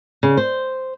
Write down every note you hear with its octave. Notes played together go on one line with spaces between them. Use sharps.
C#3
C5